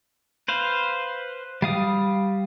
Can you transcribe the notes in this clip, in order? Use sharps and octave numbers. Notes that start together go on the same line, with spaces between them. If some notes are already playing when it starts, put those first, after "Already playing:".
B4 C5 F5
G3 F5 D#6